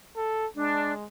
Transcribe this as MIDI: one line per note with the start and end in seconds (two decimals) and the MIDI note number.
0.17 0.47 69
0.56 1.05 56
0.56 0.92 62